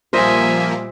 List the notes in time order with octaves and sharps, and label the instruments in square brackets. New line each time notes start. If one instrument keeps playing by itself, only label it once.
[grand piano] A#2 G3 [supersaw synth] F3 A#3 [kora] C5 D#5 [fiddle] E5 G#5